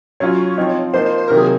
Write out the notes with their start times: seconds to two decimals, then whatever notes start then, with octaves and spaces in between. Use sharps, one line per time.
0.20 F#3 C#4 F4 C#5
0.57 F3 C4 D#4
0.94 F3 A#3 D#4 C5
1.06 C5
1.18 C5
1.28 C3 D#3 F#3 A#3 A#4
1.37 G#4